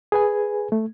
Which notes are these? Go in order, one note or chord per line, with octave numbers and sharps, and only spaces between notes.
G#4 B4 G#5
A3